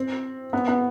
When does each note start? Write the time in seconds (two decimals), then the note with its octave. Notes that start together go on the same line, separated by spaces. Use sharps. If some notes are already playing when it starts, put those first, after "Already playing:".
Already playing: C4
0.53 B3
0.68 B3